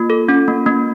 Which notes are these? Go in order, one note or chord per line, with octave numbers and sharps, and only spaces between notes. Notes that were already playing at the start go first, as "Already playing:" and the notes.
Already playing: A#3 F4
A4
C#4
A#3
A#3